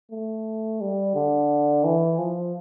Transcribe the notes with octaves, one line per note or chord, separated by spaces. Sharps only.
A3
G3
D3
E3
F3